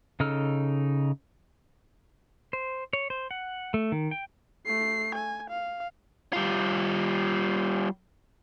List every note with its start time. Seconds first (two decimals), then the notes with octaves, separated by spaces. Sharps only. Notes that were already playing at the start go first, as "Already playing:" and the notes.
0.20 C#3 D#4 A4 E6 F6
2.53 C5
2.93 C#5
3.10 C5
3.31 F#5
3.74 A3
3.92 D#3
4.11 G5
4.66 A3 C7
5.15 G#5
5.50 F5
6.33 G3 F4